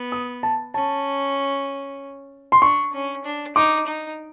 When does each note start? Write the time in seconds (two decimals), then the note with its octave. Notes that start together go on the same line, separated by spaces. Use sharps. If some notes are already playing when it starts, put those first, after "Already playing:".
Already playing: B3
0.12 D#6
0.43 A5
0.74 C#4 A5
2.52 C6
2.62 D4 C#6
2.93 C#4
3.24 D4
3.56 D#4 D6
3.87 D#4